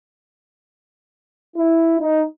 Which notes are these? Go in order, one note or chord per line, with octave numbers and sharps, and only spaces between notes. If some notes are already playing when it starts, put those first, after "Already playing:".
E4
D#4